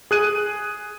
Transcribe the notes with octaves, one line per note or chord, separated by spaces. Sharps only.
G#4 F#6 D#7